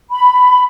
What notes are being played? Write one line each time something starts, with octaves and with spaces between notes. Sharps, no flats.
B5